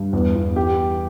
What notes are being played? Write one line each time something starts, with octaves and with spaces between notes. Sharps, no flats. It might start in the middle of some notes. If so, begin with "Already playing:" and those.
Already playing: G2
E2
E2
G4